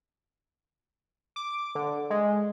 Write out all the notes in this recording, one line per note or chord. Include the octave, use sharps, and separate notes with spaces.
D6
D3
G#3